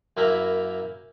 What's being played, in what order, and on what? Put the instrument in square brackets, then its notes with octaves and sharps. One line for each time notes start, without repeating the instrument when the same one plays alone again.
[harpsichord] F#2 A#3 E4 A#5 B5